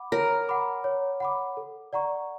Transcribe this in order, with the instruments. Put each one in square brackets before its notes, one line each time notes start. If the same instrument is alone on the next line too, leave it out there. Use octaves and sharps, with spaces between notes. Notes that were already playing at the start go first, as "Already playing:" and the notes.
Already playing: [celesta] F#5 B5 D6
[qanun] A#4 [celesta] C#5
[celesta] F#5 B5 D6
C#5
F#5 B5 D6
A4
D5 F#5 A#5 C#6